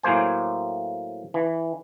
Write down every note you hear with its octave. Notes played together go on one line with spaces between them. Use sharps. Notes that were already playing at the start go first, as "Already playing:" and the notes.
A2 F#3 A#3 C5 G#5
E3